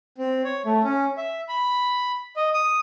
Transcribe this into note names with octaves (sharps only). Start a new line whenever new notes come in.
C4
C#5
A3
C#4
E5
B5
D#5
D#6